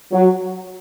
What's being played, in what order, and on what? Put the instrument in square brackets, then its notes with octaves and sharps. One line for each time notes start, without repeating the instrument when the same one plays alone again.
[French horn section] F#3